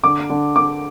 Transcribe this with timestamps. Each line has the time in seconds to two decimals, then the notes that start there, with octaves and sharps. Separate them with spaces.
0.03 D3 D6
0.30 D3
0.56 D3 D6